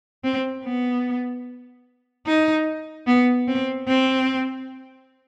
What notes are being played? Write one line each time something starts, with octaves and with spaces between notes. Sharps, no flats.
C4
B3
D#4
B3
C4
C4